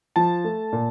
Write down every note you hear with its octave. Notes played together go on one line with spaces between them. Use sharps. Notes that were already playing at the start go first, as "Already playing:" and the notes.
F3 A5
A3
A#2